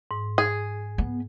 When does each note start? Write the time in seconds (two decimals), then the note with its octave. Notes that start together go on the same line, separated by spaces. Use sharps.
0.11 G#2
0.38 G#4
0.98 B3